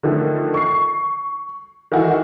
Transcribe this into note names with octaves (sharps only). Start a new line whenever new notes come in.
D3 D#3 F3 A3
C#6 C7
D#3 E3 D#4 E4 F#4 A4